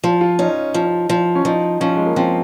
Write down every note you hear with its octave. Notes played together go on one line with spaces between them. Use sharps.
F3 F4
F4
C#4 D#4
F3
F3
C#4
F3 D#4
F3 C#4
G#3
A#3
F3 C4